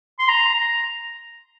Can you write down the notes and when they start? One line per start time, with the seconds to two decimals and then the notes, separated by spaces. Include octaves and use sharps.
0.19 C6
0.28 A#5
0.54 A#5